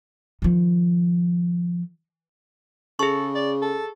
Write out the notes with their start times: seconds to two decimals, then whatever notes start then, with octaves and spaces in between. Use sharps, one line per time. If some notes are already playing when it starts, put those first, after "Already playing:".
0.42 D#3 F3
2.99 C#3 G#4 A4 C#6
3.35 D5
3.62 A4